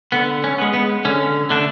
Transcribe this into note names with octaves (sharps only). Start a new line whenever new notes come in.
D3 B3
C#4
G#3 B3
B3
D3 C#4
D3 A3 D4